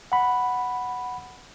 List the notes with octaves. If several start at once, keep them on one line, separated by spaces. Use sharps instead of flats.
F#5 B5